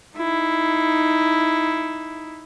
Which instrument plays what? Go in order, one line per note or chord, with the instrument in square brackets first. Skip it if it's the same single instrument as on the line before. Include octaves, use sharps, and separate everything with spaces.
[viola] D#4 E4